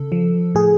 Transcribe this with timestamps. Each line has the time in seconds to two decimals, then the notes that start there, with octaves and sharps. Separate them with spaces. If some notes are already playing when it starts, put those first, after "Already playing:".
Already playing: C#3 A4
0.12 F3
0.55 A2 G#4